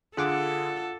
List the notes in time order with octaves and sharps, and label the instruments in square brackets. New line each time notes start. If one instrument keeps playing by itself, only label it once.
[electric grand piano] D3 D4 G#4 [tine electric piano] F4 F#5 D6 [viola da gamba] A4